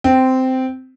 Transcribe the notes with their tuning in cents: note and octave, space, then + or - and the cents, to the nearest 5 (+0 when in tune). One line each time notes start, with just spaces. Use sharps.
C4 -10